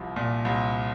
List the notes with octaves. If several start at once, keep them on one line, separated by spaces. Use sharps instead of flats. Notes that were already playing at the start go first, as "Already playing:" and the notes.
Already playing: C2 F3
A#2
C2